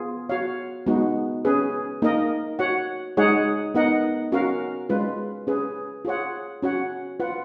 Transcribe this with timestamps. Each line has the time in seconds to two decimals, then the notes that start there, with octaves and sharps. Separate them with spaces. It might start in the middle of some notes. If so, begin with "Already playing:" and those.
Already playing: B3 F4 G#4
0.29 F#4 C#5 F5
0.86 G#3 B3 D#4 F#4
1.45 C#4 G#4 B4
2.02 A#3 D#4 A#4 D#5
2.59 F#4 C#5 F#5
3.17 G#3 D#4 G#4 C#5 F#5
3.75 B3 D#4 A#4 D#5 F#5
4.32 C#4 F#4 A#4 F5
4.89 G#3 C#4 F4 B4
5.47 C#4 G#4 B4
6.05 F4 G#4 C#5 F#5
6.62 C#4 F#4 C#5 F#5
7.20 F4 B4 F#5